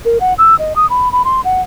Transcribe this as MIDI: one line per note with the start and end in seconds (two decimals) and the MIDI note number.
0.05 0.18 70
0.20 0.34 78
0.38 0.57 88
0.59 0.73 75
0.76 0.89 87
0.90 1.11 83
1.12 1.22 83
1.25 1.41 84
1.44 1.62 78